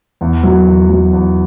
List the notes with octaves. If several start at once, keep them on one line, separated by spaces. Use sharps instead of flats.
E2
F#3
E2
F#3
E2